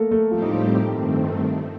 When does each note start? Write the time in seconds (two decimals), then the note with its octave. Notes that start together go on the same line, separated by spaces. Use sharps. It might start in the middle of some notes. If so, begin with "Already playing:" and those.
Already playing: A3 A#3 A4 A#4
0.11 A3 A4
0.31 A2 F3 G3 C4 F4 G4
0.42 D#4
0.51 F3 F4
0.91 G2 D#3 A3 C4